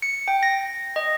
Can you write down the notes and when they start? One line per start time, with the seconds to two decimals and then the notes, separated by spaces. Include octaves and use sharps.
0.02 C#7
0.28 G5
0.43 A#6
0.96 D#5